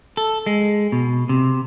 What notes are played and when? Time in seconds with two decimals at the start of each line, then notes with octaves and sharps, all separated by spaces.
0.17 A4
0.46 G#3
0.92 B2
1.29 C3